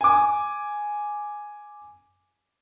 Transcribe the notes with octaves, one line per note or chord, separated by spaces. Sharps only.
G#5 D6